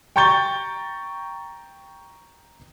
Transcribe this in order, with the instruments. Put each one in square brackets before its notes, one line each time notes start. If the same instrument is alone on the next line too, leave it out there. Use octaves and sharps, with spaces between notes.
[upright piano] G5 A#5 C#6 G6 A6 G7